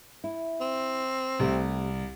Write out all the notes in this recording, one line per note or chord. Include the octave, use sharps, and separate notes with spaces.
E4
C4
C2 C3 A3 G4